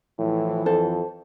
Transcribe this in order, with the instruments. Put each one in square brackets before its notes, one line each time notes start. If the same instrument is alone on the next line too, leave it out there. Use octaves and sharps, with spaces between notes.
[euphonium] A2 [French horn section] E3 F3
[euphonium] F2 [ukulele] A4 C5